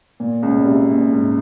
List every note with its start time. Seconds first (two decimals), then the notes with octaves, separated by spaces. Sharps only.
0.20 A#2
0.43 C#2 C#3
0.56 A#2
0.65 C2 C3
0.88 A#2
1.11 G#2